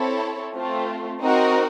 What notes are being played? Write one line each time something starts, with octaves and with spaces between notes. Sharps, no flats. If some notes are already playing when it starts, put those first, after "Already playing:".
Already playing: C4 E4 A4 C#5
A3 C4 F4
C4 D#4 F#4 A#4